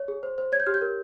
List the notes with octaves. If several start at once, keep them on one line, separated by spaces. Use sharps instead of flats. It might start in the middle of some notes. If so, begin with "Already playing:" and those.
Already playing: C#5
G#4
C5
C5
C#5 G#6
G6
G4 F6
G6
A#4